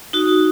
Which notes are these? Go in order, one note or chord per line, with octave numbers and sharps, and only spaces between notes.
D#4 F#4